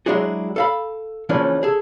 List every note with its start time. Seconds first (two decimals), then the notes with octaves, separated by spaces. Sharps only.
0.06 F#3 G#3 D4 E4 F#4 G#4
0.56 A4 F5 B5
1.29 C#3 E3 F3 A#3 C#4 D4
1.63 G#4 A4